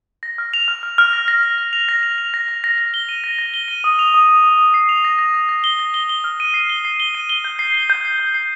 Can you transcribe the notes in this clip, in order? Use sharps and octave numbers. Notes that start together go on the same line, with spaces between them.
A#6
F6
F7
F6
F6
F6
A#6
A#6
A#6
A#6
F7
A#6
F7
F7
A#6
A#6
A#6
A#6
G7
D#7
A#6
A#6
G7
D#7
D#6
F7
D#6
D#6
D#6
D#6
C7
F7
A#6
A#6
A#6
A#6
G7
A#6
G7
G7
F6
D#7
C7
G7
C7
G7
D#7
G7
G6
C7
G7
G6
C7
G6
C7